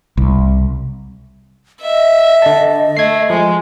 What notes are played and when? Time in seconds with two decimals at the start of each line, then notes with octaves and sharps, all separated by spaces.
0.17 C2
1.81 D#5 E5
2.42 D3 A5
2.97 A3 G#6 C7
3.30 F3 G#3